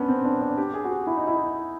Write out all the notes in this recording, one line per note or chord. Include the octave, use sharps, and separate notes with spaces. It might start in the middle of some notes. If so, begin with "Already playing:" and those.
Already playing: B3 C#4 D4
C4
D4
D4
G4
G#4
F#4
G4
E4
D#4
E4